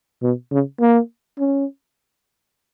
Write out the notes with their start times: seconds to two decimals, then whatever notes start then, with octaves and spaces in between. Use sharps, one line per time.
0.23 B2
0.52 C#3
0.81 A#3
1.39 C#4